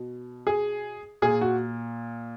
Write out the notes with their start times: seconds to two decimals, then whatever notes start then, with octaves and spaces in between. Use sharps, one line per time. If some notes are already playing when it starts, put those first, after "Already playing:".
Already playing: B2
0.47 G#4
1.22 A#2 G#4
1.41 F#4